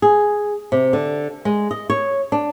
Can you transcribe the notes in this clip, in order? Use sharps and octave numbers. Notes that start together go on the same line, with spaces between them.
G#4
C3
D3
G#3
D#5
C#5
D4